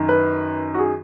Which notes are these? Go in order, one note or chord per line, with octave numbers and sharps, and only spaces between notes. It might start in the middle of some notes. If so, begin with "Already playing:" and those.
Already playing: F#2 D#3
B4
F#4
G#4